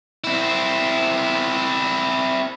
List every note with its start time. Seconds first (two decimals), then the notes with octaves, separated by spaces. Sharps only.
0.24 C4 E4